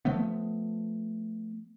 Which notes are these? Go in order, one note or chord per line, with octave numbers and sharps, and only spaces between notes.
F3 A3 B3